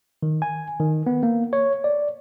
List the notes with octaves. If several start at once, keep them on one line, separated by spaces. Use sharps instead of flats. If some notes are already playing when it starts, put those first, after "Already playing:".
D#3
G#5
D#3
B3
A#3
C#5
D5